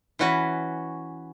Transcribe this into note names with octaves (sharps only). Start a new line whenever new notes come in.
E3 C#4 F#4 B4